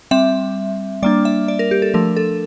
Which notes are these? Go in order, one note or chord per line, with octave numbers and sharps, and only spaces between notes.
G3 C4 E5
G3 A#3 D4 D5
E5
D5
A#4
G4
A4
F3 A3 D4 A#4
A4